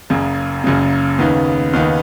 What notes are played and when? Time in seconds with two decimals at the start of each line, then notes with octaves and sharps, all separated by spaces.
0.10 F#1 F#2 C#3
0.64 F#1 F#2 C#3
1.19 D#2 C#3 B3 D#4
1.73 D#2 C#3 B3 D#4